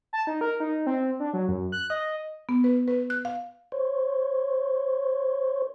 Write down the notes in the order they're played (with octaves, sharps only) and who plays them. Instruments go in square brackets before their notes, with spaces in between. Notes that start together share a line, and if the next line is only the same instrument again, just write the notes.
[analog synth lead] A5
D#4
A#4
D#4
C4
D4
F#3
F#2
F#6
D#5
[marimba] B3
B4
B4
F#6
F5
[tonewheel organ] C5 C#5